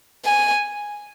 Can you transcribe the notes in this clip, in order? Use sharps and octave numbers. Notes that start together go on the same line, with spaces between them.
G#5